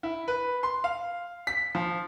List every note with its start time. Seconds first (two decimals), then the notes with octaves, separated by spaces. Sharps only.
0.03 E4
0.28 B4
0.63 C6
0.84 F5
1.47 B6
1.75 F3